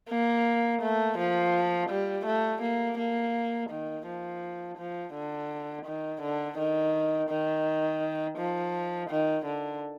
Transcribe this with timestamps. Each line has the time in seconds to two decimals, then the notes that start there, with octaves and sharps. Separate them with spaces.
0.10 A#3
0.82 A3
1.18 F3
1.90 G3
2.26 A3
2.62 A#3
2.98 A#3
3.70 D#3
4.07 F3
4.78 F3
5.14 D3
5.86 D#3
6.22 D3
6.58 D#3
7.30 D#3
8.38 F3
9.10 D#3
9.46 D3